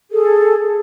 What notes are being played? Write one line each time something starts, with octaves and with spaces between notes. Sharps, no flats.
G#4 A4